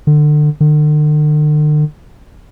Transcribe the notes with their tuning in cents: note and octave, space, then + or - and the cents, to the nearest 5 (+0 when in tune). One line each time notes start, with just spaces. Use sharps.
D3 +30
D3 +45